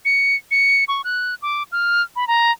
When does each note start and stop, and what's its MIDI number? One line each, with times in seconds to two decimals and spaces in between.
0.05 0.36 97
0.51 0.84 97
0.88 1.02 85
1.04 1.35 90
1.42 1.63 86
1.72 2.02 89
2.16 2.27 83
2.27 2.51 82